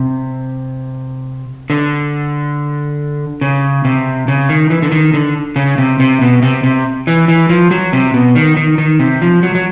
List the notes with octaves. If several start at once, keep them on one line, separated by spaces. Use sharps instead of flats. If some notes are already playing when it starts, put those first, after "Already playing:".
Already playing: C3
D3
C#3
C3
C#3
D#3
E3
D3
D#3
D3
C#3
C3
C3
B2
C3
C3
E3
E3
F3
F#3
C3
B2
D#3
D#3
D#3
C3
F3
F#3
F#3